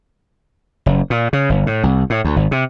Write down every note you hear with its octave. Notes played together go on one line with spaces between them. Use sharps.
F#1
A#2
C#3
G1
A2
C2
A2
D2
G#1
C3